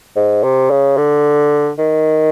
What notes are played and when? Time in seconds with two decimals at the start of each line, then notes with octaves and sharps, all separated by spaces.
0.16 G#2
0.43 C3
0.71 C#3
0.97 D3
1.79 D#3